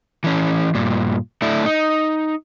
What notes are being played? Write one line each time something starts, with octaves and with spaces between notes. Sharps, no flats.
E3 C#4
G2 A#2
A3 D4 E4
D#4